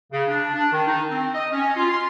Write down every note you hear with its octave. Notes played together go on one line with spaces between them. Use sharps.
C#3
D4
D4
D#3
D#4
C4
D#5
C#4
F4
C6